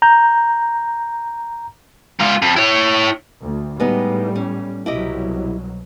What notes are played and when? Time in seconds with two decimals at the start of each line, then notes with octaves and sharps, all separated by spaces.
0.02 A#5 G6
2.19 G#2 F4
2.42 F2
2.56 E4 C#5
3.43 D2
3.80 A2 G3 G#3 B3 D#4
4.36 C#4
4.86 C2 B2 F#3 E4 G4 D#5